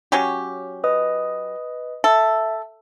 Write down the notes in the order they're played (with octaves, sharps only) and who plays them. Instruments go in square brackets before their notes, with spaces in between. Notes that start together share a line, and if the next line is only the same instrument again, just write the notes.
[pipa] F#3 C#4 G4
[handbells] B4 D#5 D#6
[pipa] A4 [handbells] E5